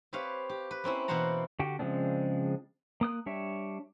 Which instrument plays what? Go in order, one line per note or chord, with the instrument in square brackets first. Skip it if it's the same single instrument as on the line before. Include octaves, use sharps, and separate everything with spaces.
[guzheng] C4 G4 B4 C#5 F5
G4
B4
A#3 C4 C#4 E4
B2 E3 A#3 C5 F#5 A#5
[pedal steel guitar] D3 F#4 G4
C#3 F3 G#3 C4 D4
A#3 D#6 F#6
G3 D4 C#5 E5